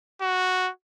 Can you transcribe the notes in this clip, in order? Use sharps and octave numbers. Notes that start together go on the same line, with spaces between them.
F#4